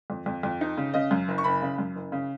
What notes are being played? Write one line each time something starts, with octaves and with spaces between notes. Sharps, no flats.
F2
F2
F2
D#4
C#3
C#3 D#5
F#2
F#1
C#6
F#1 B5
C#3
F#2
F#1
C#3